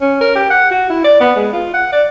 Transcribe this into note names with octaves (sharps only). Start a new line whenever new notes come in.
C#4
A#4
G4
F#5
F#4
E4
D5
B3
G#3
F4
F#5
D5